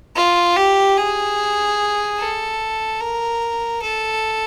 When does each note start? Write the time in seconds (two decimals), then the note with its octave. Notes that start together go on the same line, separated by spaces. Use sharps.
0.16 F4
0.57 G4
0.98 G#4
2.19 A4
3.01 A#4
3.82 A4